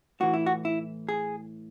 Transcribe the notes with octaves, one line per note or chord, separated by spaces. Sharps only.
A2 E3 F#4
E4
F#4
E4
G#4